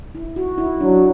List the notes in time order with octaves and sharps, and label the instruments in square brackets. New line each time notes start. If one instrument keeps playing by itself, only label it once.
[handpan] E4
F#4
E4
[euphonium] F#3 [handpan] D4